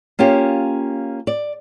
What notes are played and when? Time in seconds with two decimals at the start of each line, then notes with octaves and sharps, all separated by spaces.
0.19 A#3 C#4 F4 G4
1.27 D5